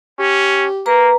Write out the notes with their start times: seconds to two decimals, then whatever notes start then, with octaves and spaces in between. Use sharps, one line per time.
0.19 C#4 G4
0.86 A#3 B4 A#5